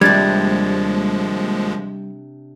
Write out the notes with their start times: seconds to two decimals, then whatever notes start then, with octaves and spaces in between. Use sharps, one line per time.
0.01 D#2 C3 F3 G3 G#3 D4 G#6 A6